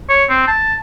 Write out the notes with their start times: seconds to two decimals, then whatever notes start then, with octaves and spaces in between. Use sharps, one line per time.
0.09 C#5
0.29 C4
0.48 A5